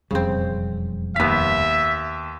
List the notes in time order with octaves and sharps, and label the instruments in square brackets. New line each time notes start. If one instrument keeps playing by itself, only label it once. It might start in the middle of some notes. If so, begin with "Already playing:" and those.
[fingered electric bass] E1 F2 G3 [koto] C#3 C4
[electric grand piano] D#2 B6 [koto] B3 F5 [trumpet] E5